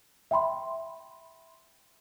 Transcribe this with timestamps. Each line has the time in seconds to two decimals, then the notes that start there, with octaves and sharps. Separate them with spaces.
0.31 E5 G5 B5 C6